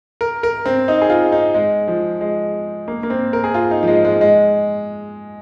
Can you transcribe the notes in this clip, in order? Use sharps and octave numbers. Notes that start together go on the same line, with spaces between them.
A#4
A#4
C4
D#4
G#4
F4
D#4
G#3
F3
G#3
A#3
A#3
C4
A#4
G#4
F4
D#4
F3
G#3
G#3
G#3